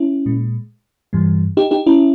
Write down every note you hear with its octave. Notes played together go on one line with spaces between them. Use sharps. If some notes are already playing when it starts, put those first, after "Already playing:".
Already playing: C#4 E4
A#2 G#3
G2 E3 G3
D#4 G4
D#4 G4
C#4 E4